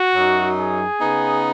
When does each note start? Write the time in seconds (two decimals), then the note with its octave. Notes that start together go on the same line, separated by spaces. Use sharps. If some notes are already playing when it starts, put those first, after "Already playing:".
Already playing: F#4
0.14 F#2 F#3 D#4
0.58 G#4
1.01 C#3 B3 D#4